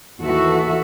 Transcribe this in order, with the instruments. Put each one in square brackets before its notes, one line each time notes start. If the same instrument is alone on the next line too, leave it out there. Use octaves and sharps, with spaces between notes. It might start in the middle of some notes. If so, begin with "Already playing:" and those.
[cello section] D#2 E3 F#4 A4 E5